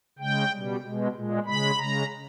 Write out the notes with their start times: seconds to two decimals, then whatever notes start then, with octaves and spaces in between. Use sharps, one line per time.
0.19 C#3 G#3 G5
0.51 B2 G3
0.83 B2 G#3
1.14 A#2 G#3
1.46 C#3 G#3 B5
1.77 C#3 G#3 A#5